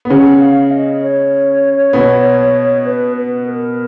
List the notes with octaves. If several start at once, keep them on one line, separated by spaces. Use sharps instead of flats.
B3
C#3 C#4 F#5
F5
D#5
C#5
B2 B3
B4
B4
A#4